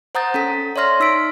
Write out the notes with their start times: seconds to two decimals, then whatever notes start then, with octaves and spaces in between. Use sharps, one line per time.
0.15 C5 F#5 A#5 D#6 G6 A6
0.34 C#4 A4 B6
0.76 C#5 D5 E5 C6 F6 A#6
1.00 D#4 E6 B6 D7